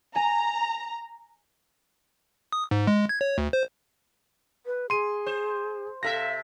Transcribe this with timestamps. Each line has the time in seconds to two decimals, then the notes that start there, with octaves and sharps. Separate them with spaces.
0.16 G#5 A#5
2.52 D#6
2.71 G#2
2.87 G#3
3.09 G#6
3.21 C#5
3.38 D2
3.53 C5
4.66 B4
4.90 G#4 C6 D#7
5.26 C5
6.03 C3 A4 E5 F5 A#6